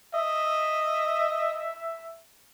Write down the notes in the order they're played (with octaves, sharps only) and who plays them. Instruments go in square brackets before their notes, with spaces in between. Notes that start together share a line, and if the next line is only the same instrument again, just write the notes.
[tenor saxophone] D#5 [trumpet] E5